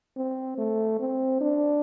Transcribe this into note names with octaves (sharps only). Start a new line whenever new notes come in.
C4
A3
C4
D4